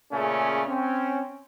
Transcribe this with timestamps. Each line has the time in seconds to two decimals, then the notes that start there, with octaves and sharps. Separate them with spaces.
0.12 A#2 C#3 A3 C#4 G#4
0.68 C4 C#4